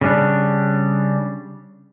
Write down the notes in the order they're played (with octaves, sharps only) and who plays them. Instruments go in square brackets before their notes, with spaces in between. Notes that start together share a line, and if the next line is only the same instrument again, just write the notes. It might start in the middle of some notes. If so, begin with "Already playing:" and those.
[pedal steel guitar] C#3 G3 D4